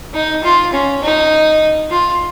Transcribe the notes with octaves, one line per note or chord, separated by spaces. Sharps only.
D#4
F4
C#4
D#4
F4